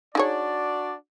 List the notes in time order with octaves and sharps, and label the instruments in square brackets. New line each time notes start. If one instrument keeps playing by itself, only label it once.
[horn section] D4 F#4 D5 [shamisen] D#4 G#4 C#5